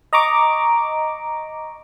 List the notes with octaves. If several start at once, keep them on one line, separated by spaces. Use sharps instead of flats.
D#5 A#5 C#6 D6